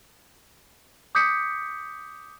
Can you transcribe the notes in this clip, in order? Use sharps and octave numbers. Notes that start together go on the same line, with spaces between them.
D6 D#6 G6 B6 C#7